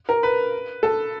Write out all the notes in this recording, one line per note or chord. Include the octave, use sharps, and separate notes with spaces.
A#4
B4
A4